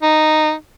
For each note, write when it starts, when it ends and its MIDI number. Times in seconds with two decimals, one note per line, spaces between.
0.02 0.53 63